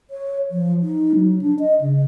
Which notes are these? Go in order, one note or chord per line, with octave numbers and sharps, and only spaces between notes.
C#5
F3
D#4
F#3
D4
D#5
C#3